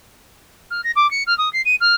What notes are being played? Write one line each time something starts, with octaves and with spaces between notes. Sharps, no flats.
F6
A#6
D6
C#7
F6
D#6
C7
D#7
F6